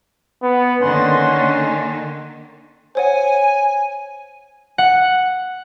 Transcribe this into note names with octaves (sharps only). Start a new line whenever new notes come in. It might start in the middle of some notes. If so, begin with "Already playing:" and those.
B3
D3 D#3 A#3 C#4 F#5 C6
C5 C#5 F#5 G#5
F#5